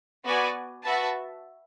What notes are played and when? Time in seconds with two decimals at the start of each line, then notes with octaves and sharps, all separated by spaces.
0.24 B3 F#4 B4 D5 G#5
0.83 F#4 B4 E5 A5